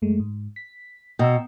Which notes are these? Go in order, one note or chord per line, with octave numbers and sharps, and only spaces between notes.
F#2 G#3 A3
G#2
B6
B2 G5 A#5 E6